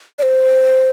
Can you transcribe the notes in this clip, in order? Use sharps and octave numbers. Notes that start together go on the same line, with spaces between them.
D5
C5